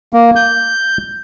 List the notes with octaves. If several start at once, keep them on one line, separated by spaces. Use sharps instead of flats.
A#3
G6